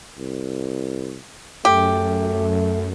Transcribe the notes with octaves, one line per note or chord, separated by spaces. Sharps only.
C2
F#2 A3 G4